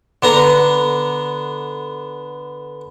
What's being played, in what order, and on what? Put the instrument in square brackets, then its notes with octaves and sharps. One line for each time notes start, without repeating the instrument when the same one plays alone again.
[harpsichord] D3 B3 A#5